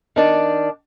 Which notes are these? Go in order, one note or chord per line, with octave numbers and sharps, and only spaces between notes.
D#3 D4 D5